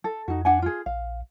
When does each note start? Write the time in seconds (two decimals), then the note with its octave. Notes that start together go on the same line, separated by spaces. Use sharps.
0.04 A4
0.28 F2 D#4 F#4
0.45 D4 F#5 G#5
0.62 F4 G#4
0.86 A#1 F5